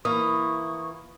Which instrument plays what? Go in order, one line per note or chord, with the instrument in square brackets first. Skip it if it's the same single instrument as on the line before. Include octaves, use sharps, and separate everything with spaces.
[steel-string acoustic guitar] E3 A#3 [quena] C#6 [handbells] D#6